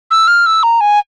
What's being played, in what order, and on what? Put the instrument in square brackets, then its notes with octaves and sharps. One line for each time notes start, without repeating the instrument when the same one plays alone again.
[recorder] E6
F6
E6
A#5
G#5